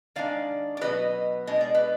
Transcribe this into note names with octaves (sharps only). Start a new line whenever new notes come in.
D#3 G#3 D4 D5 F5
D5
B2 F#3 B3 B4 D#5
B2 G#3 D4 D#5
D5
B4